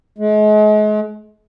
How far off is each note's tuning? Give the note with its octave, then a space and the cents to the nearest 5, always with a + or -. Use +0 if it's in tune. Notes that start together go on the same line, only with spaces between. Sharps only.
G#3 +40